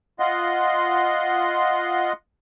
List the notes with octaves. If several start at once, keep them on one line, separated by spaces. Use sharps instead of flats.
F4 D#5 F#5 C6